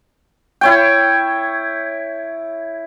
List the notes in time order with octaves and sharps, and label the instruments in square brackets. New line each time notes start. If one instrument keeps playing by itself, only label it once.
[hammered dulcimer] E4 C#5 G5